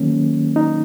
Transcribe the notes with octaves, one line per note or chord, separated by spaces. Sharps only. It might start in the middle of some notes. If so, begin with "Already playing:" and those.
Already playing: D#3 F#3 A#3 C#4
D#4